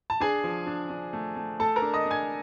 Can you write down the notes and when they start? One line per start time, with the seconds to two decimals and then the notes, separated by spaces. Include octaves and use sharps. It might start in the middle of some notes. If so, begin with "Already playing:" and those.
0.10 A5
0.20 D4 G#4 G#5
0.44 F3
0.67 D4
0.90 D4
1.13 A3
1.36 A3
1.59 A3 A4 A5
1.76 A#4 A#5
1.82 D4
1.94 D#5 D#6
2.05 D4
2.11 G#5 G#6